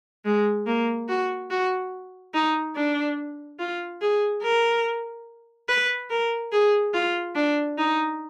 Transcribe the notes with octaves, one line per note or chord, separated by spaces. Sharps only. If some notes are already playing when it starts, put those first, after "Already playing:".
G#3
A#3
F#4
F#4
D#4
D4
F4
G#4
A#4
B4
A#4
G#4
F4
D4
D#4